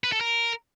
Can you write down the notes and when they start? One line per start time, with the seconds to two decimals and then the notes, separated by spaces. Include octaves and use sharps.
0.04 B4
0.12 A4
0.21 A#4